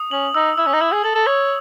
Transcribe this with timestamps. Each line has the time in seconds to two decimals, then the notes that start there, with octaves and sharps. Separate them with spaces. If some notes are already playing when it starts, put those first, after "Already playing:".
Already playing: D#6
0.11 C#4 F#7
0.35 D#4 E6
0.58 E4 E6
0.67 C#4
0.73 D#4
0.81 E4 E6
0.92 G#4
1.04 A4 F#7
1.15 A4
1.27 C#5 D#6